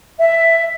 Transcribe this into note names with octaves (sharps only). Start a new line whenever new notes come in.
E5